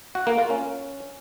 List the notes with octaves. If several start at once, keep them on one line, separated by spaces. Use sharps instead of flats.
F#4
A#3
F4
C#4